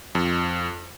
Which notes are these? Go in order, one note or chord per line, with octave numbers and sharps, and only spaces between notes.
F2